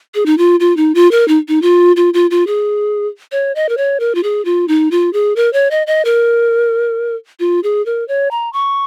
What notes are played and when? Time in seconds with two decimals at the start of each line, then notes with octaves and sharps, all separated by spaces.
0.15 G#4
0.26 D#4
0.38 F4
0.60 F4
0.77 D#4
0.95 F4
1.11 A#4
1.28 D#4
1.48 D#4
1.62 F4
1.96 F4
2.14 F4
2.31 F4
2.47 G#4
3.32 C#5
3.55 D#5
3.69 A#4
3.77 C#5
4.00 A#4
4.15 F4
4.23 G#4
4.45 F4
4.68 D#4
4.91 F4
5.13 G#4
5.36 A#4
5.53 C#5
5.71 D#5
5.87 D#5
6.05 A#4
7.40 F4
7.64 G#4
7.86 A#4
8.08 C#5
8.31 A#5
8.53 C#6